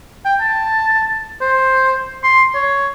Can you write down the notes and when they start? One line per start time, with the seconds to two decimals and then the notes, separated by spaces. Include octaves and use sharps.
0.25 G5
0.41 A5
1.41 C5
2.23 C6
2.55 C#5